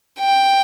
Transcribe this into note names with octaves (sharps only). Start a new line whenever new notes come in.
G5